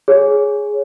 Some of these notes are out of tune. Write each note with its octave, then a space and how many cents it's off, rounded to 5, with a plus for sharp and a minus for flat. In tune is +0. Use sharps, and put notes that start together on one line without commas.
G#4 +0 C#5 +0